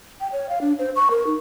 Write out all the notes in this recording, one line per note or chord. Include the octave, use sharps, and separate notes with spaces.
G5
C#5
F5
D4
C5
C#6
A#4
D#4